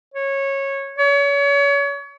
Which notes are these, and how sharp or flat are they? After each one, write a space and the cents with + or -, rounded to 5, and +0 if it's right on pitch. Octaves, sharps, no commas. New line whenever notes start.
C#5 -15
C#5 +35